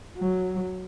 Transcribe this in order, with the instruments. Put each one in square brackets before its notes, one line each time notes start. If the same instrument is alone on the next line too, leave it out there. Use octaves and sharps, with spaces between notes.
[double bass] F#3